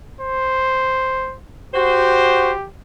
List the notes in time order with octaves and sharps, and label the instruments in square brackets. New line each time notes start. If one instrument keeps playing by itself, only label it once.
[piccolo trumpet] C5
[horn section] F#4 C5 [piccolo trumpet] G4